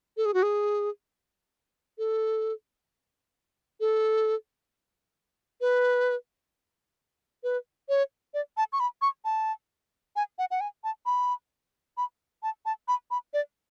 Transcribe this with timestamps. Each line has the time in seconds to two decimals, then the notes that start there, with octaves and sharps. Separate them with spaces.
0.17 A4
0.25 G#4
0.34 F#4
0.43 G#4
1.98 A4
3.80 A4
5.61 B4
7.43 B4
7.89 C#5
8.34 D5
8.57 A5
8.73 C#6
8.80 B5
9.02 C#6
9.25 A5
10.16 G#5
10.38 F#5
10.51 F#5
10.61 G#5
10.84 A5
11.06 B5
11.97 B5
12.43 A5
12.66 A5
12.88 B5
13.11 B5
13.34 D5